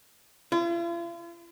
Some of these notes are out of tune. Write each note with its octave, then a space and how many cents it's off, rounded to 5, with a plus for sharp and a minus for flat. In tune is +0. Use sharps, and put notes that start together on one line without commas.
F4 -45